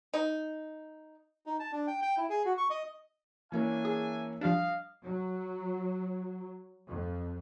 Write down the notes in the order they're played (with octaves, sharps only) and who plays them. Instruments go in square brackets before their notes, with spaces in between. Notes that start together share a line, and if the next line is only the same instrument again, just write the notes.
[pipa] D#4
[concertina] D#4
A5
D4
G5
G5
E4
G#4
F#4
C#6
D#5
[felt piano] E3 A#3 C#4 [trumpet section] D4 E5 G#5
[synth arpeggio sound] G#4
[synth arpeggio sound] F3 G3 D4 [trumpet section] D#5 F5
[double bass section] F#3
F2